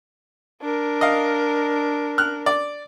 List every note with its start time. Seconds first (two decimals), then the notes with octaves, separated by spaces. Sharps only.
0.62 D4 A#4
1.01 D#5 F5
2.18 F6 F#6
2.46 D5